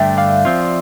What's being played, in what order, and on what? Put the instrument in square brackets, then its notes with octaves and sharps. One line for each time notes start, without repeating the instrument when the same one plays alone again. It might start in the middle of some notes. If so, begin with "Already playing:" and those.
Already playing: [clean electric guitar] G2 D3 A3 D4 [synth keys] E5 G5
[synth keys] D5 F5
[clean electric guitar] F3 C4 F4